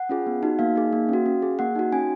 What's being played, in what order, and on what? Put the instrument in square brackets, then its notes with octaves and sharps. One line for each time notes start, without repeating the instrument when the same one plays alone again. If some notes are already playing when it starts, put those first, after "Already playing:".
Already playing: [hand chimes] F#5
C#4 F4 G#4
B3
D#4 F#4
A#3 F5
D#4 G#4
A#3
C#4 F#4
C#4
G#4
A#3 F#5
D#4 F#4
C#4 G#5